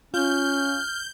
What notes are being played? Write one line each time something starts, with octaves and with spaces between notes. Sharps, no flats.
C#4 F4 F6 G6